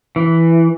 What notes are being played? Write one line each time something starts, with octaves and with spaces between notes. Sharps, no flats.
E3